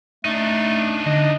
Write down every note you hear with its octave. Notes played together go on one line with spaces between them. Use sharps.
A3 D4 D#4
D3 D#5